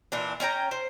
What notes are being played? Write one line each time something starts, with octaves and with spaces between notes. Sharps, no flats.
A#2 E3 D4
C#4 C#5 G5 A#5
C5